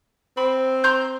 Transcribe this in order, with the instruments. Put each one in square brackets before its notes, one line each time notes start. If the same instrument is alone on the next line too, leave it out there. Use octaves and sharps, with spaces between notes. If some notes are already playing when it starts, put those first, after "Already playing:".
[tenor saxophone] C4 [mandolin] B5
[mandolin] A#5 C6 G6